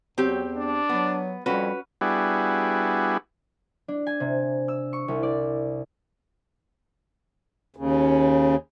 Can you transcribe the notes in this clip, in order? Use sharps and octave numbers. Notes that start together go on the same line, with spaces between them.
E2 F#3 C4 G4
D4
F#3 B3
F2 G3 C#4 F#4 B4
G3 B3 D4 E4 F#4 G#4
D4
G#5
C3
E6
C#6
C2
D5
D#2 C#3